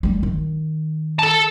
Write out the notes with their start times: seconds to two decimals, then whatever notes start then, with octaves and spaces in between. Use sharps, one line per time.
0.03 G3 A3
0.23 D#3
1.19 A4 A5